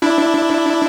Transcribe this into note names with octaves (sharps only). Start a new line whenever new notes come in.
D4 E4